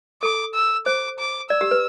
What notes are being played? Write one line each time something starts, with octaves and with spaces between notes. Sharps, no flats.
A4 D6
E6
C5 D6
D6
D5 E6
G4
B4